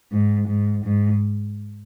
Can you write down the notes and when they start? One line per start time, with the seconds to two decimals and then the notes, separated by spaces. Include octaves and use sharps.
0.12 G#2
0.48 G#2
0.84 G#2